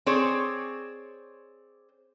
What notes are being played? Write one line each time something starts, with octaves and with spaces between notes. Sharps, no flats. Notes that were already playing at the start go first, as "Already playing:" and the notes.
C4 G#4 C#5 D5